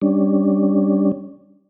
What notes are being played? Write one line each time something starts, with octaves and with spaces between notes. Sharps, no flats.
G3 C#4 D4